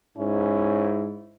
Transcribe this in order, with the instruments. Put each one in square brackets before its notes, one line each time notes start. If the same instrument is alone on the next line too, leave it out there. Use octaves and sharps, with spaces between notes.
[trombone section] G#2 E4 [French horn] C#4